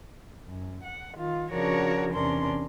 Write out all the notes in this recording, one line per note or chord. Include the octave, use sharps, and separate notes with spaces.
F#2
F#5
D#3 F4
C#3 F3 D4 F#4 A#4 C#5
E2 C3 C#4 D4 A#4 C6